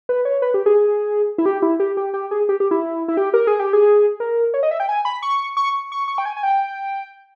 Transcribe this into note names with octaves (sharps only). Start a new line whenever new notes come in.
B4
C#5
B4
G4
G#4
E4
G4
E4
G4
G4
G4
G#4
G4
G4
E4
E4
G4
A#4
G#4
G4
G#4
A#4
C#5
D#5
E5
G5
G#5
B5
C#6
C#6
C#6
C#6
G5
G#5
G#5
G5